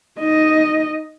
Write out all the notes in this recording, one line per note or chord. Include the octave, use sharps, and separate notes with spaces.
D#4 D#5